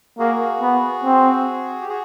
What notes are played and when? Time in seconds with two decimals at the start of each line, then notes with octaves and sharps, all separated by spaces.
0.19 A#3 F#4 G#4
0.62 B3
1.04 C4
1.81 G4
1.89 F#4 G#4